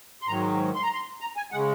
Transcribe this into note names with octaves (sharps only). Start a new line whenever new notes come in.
C6
G#2 D#3 F#3 A#5
C6
A#5
C6
A#5
G#5
C#3 G#3 F#5